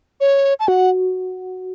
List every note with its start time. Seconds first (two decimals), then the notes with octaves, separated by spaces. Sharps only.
0.20 C#5
0.60 A5
0.68 F#4 F#5